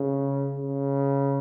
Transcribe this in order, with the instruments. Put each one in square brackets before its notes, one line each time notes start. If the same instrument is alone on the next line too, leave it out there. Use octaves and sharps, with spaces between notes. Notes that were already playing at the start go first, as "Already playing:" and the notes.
Already playing: [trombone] C#3
C#3